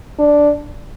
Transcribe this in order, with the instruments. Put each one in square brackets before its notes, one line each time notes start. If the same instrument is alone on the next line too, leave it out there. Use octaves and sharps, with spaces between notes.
[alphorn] D4